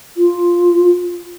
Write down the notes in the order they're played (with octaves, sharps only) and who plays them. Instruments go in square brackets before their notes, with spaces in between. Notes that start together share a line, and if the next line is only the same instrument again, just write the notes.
[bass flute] F4